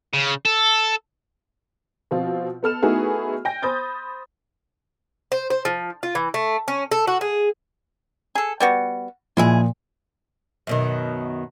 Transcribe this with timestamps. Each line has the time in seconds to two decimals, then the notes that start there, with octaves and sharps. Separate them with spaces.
0.14 C#3
0.45 A4
2.11 B2 F3 C4 F4
2.63 B3 A4 F6 E7
2.83 A3 B3 D#4 E4 F#4 G#4
3.45 G5 G#5 G6 A#6
3.62 C5 B5 D#6 G6 A6
5.32 C5
5.50 C5
5.65 F3
6.03 F4
6.15 E3
6.34 A3
6.68 C#4
6.92 A4
7.07 F#4
7.21 G#4
8.35 G#4 A4
8.60 G3 B3 F#4
9.37 A#2 F3 G#3 E4 G#4
10.67 F#2 B2 D#3